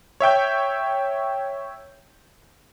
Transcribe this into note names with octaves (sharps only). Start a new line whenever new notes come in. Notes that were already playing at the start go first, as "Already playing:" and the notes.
C#5 E5 G5 G6